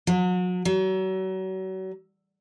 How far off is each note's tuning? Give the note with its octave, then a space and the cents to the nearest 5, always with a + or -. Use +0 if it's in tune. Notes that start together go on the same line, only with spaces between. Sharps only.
F#3 -35
F#3 +35